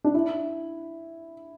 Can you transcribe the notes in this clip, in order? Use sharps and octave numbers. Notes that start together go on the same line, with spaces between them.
D4
E4